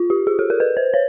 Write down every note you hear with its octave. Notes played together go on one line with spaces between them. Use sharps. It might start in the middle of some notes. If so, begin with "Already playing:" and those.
Already playing: F4
G4
G#4
A4
A#4
B4
C5
C#5